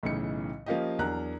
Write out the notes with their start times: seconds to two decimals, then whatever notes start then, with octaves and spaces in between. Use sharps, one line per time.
0.03 B1 A2 C#3 E3 D#4 C#7
0.66 F3 A#3 C#4 F4 G4 D#5
0.99 E2 F#3 D4 A#4 A#5 F#6